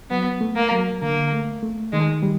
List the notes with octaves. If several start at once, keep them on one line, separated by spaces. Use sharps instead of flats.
F#3 B3
A3
A#3
F#3
D3 A#3
A3
A3
D#3 G#3
G3